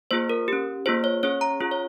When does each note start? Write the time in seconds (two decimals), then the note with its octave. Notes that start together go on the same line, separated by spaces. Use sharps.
0.11 A#3 F4 G#4 C5
0.30 A#4
0.48 C#4 G4
0.86 A#3 F4 G#4 C5
1.04 C#5
1.23 C#4 G#4 C#5
1.41 A#5
1.60 C#4 F4 G#4
1.71 C#5